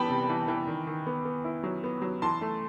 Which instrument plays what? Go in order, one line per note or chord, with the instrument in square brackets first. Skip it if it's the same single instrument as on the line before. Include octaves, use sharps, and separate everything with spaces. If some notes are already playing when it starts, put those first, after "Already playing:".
Already playing: [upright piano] E3 G3 B3 G5 A5 B5
C3
E3
E3
D#3
D#3
B3
B3
E4
F#3
B3
F#3
E3 A5 C6
A3